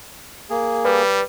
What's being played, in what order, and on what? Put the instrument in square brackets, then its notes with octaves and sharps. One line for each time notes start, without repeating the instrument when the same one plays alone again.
[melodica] A#3 G#4
[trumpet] G3 [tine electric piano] B4